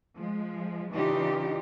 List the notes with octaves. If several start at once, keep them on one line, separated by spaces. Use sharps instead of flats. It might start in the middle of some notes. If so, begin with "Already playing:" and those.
F3 G#3
C#3 E3 D4 D#4 F4 G4